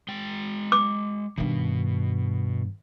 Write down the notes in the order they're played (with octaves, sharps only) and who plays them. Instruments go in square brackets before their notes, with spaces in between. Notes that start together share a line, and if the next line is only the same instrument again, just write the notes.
[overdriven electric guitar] G#3 G5
[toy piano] D6
[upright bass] G2 D#3 [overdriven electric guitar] B2